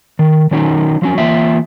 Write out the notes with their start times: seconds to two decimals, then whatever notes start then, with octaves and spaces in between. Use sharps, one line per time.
0.19 D#3
0.51 D#3 F#3 C#4 D#4
1.02 F3 F#3 C#4
1.18 E3 A#3 F4 E5